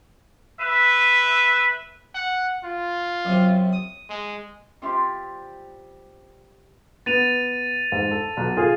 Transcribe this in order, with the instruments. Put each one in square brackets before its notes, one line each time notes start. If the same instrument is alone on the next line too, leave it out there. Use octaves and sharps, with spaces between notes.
[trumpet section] B4 E5
[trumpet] F#5
F4
[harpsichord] F#2 C3
D#6
[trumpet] G#3
[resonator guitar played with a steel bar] G3 C4 F4 G4 E5
[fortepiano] B3 [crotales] A6 D#7 F7
[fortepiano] G#2
A4
B1
F4 G#4